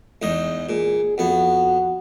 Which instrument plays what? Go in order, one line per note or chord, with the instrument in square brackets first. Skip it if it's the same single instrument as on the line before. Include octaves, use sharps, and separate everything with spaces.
[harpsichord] E2 G#2 D#5
[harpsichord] A#2 [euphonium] G#4
[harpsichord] F2 B3 [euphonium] F#4